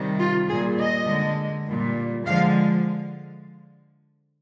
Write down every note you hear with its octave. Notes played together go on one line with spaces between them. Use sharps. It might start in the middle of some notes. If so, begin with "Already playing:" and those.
Already playing: C3 D#3 G3
F4
A#2 G3 G#4
D#5
D3 G#3
A#2 G3
D3 F3 G#3 F5